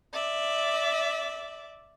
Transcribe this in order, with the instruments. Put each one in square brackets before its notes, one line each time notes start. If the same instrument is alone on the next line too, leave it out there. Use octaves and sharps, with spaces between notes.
[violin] D5 E5